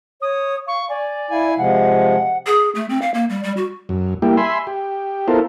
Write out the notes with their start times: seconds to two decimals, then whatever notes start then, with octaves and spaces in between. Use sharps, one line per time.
0.21 C#5 D#6
0.67 F5 C#6
0.89 D5 G#5
1.31 E4 F5 G#5
1.58 C3 F3 G#3 F#5
2.46 G#4
2.75 A3
2.89 C4
3.02 F5
3.14 A#3
3.30 G3
3.43 G3
3.57 F#4
3.89 F#2
4.22 G3 A#3 E4 G4
4.37 E5 G#5 B5 C6
4.67 G4
5.28 B3 E4 F4 A4 A#4 C5